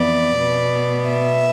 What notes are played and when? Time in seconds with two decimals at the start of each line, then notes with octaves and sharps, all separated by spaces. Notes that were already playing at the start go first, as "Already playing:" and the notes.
Already playing: F2 E3 B3 D5
0.38 B2
0.44 B3
1.09 E5